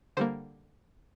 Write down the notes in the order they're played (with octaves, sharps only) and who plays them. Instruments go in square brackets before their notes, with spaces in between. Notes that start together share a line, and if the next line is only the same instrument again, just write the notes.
[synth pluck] D3 G3 A#3 C5